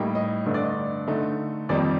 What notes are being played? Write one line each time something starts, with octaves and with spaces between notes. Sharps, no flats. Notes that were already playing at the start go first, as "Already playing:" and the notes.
Already playing: A2 G3 A#3 D#4 G5
D#5
G2 D3 A3 D4 D#5
D5
D#5
D3 A3 D#4
F2 D#3 G3 A#3 D#4 D5